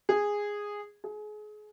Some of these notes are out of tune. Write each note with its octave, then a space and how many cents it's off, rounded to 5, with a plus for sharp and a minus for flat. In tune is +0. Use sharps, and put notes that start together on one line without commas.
G#4 -10
G#4 +30